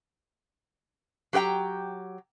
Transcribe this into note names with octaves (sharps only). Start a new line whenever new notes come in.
F#3 G4 B4 G5 A#5